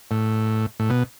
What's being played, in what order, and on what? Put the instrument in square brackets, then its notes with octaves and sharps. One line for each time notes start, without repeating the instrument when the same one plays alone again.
[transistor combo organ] A2
A2
B2